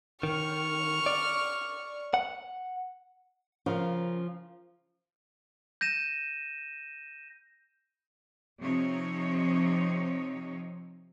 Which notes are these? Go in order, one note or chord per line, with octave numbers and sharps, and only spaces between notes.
D#3 C#6 F6
D5
F#5
C#3 F3 A#4 F5
G6 A#6 D#7 E7
C3 F3 C4 D#4 C#5